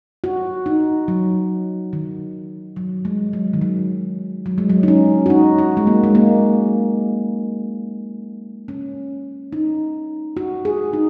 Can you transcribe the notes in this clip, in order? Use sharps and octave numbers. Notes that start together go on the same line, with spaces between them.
F#4
D#4
F#3
D#3
F#3
G#3
F#3
D#3
F#3
F#3
G#3
F#3
D#4
C#4
F#4
D#4
F#4
G#3
A#3
G#3
A#3
C#4
D#4
F#4
G#4
D#4